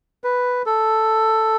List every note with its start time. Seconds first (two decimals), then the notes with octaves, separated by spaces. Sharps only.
0.24 B4
0.66 A4